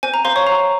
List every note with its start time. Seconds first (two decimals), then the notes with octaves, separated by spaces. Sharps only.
0.03 C5 G#5
0.14 A#5
0.25 C5 F5 C6
0.36 C#5 C#6
0.47 F5 A#5